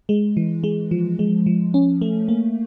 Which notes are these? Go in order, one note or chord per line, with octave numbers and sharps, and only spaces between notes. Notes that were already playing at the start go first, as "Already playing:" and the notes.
G#3
E3
G#3
F3
G#3
F3
C#4
A3
A#3